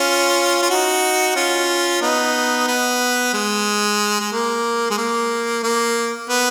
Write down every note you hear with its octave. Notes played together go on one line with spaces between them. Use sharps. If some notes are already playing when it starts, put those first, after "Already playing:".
Already playing: C#4 F4
F4
D#4 F#4
C#4 F4
B3 D#4
B3
G#3
G#3
A#3
G#3
A#3
A#3
B3